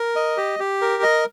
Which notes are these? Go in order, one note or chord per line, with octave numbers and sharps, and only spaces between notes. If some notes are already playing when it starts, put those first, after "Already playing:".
Already playing: A#4
D#5
G4
G4
A#4
D#5